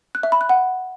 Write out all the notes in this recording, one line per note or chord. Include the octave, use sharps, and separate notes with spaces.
F#6
E5
B5
F#6
F#5